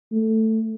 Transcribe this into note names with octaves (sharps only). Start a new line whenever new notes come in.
A3